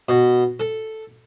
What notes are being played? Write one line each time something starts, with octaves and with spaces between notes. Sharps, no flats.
B2
A4